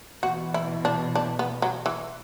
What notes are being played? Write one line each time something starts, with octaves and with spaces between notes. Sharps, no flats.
B2 E3 F#4
E4
D4
D4
B3
F#3
E3